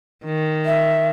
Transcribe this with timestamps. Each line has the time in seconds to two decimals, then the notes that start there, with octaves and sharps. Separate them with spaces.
0.25 D#3
0.66 E5